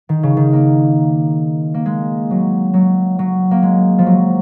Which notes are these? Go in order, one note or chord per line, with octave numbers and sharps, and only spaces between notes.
D#3
C#3
D#3
A#3
A#3
G#3
F#3
F#3
F#3
A#3
G#3
F3
F#3